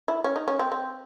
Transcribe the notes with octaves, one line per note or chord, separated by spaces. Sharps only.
E4
C#4
D#4
C#4
C4
C4